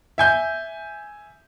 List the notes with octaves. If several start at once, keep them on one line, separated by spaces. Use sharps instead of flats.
E5 G#5 G6